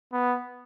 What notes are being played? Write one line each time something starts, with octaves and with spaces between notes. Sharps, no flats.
B3